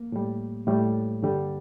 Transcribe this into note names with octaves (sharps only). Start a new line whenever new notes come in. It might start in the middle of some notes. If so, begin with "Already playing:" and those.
Already playing: A#3
A2 G3
A2 G3
G2 D3 G3